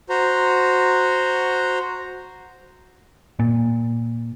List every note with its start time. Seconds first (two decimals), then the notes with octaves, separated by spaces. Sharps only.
0.10 F#4 C5 A#5
3.39 A#2